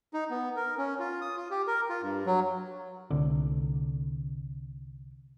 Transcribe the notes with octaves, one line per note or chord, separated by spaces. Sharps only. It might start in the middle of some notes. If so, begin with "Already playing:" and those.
D#4
B3
A#4
C#4
F4
D#6
F4
G4
A#4
F4
G2
F#3
C2 D3